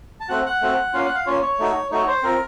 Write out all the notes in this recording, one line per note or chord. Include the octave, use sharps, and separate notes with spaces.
A5
A3 C4 F#4 F#5
F#5
A3 C4 F#4
A#3 C#4 F4 F5
F#5
F5
A#3 C#4 F4 C#5
C#5
A3 D#4 F#4
A3 D#4 F#4 C#5
C5
C4 F4 A#4